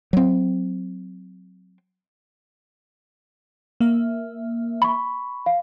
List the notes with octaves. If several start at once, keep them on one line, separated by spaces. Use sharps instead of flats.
F#3 C4
A#3 E5
B5 C#6
F5